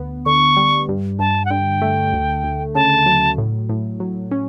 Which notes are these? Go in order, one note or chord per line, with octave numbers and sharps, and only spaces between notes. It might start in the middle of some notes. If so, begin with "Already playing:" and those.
Already playing: D2 B3
D3 C#6
G3
G2
G2 A5
F#5
D3 G5
A3
D2
D2
C#3 A5
F#3
A2
A2
F#3
C#4